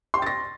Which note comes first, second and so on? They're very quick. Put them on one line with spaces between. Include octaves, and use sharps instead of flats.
C6 G5 A6 A#6